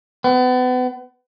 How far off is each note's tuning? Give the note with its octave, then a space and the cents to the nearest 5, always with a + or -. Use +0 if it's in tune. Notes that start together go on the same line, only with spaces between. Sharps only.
B3 +35